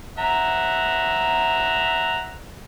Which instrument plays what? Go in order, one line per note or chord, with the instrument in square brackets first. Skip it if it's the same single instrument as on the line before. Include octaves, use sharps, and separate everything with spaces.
[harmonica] E5 F#5 A#5